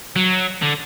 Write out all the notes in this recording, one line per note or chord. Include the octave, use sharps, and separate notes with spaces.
F#3
D3